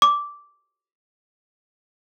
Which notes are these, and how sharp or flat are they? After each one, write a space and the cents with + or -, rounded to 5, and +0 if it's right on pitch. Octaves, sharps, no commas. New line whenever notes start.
D6 -10